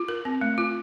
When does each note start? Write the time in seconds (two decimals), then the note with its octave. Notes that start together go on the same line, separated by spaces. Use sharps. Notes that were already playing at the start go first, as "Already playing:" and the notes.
Already playing: F4
0.08 A#4
0.25 C4
0.41 A3
0.58 F4